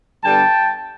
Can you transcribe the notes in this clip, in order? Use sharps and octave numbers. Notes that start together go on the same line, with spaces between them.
G2 D3 G3 B3 G5 A5